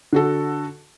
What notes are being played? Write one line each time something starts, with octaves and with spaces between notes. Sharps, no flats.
D3 F#4 A4